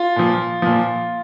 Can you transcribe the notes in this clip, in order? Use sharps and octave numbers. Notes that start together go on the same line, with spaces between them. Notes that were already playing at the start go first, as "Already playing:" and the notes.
Already playing: F4
A#2 F3
A#2 F3